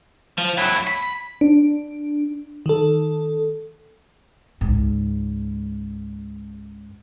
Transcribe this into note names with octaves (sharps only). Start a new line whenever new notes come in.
F3
F#3 E4
B5
D4
D#3 A4
C#2 G#2